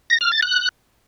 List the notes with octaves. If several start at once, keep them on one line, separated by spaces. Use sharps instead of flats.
A#6
F6
A6
F#6